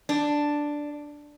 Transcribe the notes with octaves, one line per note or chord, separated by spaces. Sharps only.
D4